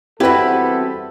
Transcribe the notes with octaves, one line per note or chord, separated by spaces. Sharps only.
E2 G3 C4 E4 F#4 G4 A4 B4